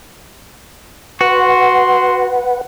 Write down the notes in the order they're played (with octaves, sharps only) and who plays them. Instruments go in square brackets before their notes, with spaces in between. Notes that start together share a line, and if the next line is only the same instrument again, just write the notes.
[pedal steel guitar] F#4 [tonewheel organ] B4 F#5 [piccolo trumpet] C6